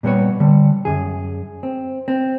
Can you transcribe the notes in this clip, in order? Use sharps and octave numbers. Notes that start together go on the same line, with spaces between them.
A#2 G3 B3 C#5
D3 G3
F#2 G#4
C4
C4